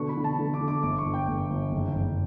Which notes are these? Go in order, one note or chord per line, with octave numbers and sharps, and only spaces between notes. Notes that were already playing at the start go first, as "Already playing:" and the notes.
Already playing: B2 D3 C#6
B5
D3
A5
D3
D6
D3
D6
G1 D6
C#6
G1
G5
G1
G1
F#1
F#1